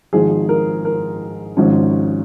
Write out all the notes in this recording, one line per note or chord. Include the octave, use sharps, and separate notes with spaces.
G#1 G#2 F3 G#4
A#4
A#4
G#1 G#2 F3 C#4